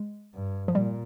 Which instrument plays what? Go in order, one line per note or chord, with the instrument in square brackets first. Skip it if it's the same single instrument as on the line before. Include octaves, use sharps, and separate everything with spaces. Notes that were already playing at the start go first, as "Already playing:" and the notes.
Already playing: [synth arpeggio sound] G#3
[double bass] G2
[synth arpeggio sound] F3
[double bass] A#2 [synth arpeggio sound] G3